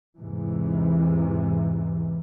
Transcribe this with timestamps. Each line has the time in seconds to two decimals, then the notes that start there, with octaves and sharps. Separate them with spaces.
0.17 E2 G#2 C3 E3